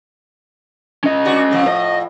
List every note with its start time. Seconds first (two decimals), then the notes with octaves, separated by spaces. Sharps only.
1.04 C#4 D#5
1.25 D4 F#4
1.51 A2 F3
1.68 D#5